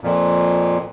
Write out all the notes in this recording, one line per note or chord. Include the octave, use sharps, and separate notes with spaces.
F2 A#2